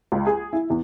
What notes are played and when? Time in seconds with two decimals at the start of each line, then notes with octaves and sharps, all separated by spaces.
0.12 C#2
0.27 G#4
0.53 E4
0.70 E2